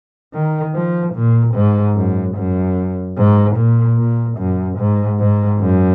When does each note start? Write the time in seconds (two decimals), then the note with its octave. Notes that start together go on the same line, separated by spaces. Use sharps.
0.33 D#3
0.75 F3
1.14 A#2
1.54 G#2
1.96 F#2
2.35 F#2
3.17 G#2
3.57 A#2
3.98 A#2
4.38 F#2
4.78 G#2
5.19 G#2
5.60 F#2